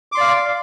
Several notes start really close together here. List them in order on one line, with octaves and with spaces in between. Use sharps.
D6 C6 D5 F5